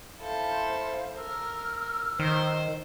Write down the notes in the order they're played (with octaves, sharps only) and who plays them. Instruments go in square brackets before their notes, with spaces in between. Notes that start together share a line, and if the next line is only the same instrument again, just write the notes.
[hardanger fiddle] E4 A4 [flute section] C5 F5
[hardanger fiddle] A#4 [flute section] E6 F6
[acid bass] D#3 [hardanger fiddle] C5